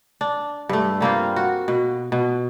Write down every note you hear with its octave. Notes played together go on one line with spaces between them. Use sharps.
D4
G2 A3
G3 A#3 C4 F4
F#4
B2
B2